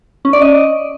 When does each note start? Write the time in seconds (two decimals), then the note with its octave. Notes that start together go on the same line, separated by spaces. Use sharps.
0.25 C#4
0.33 D5
0.42 D#5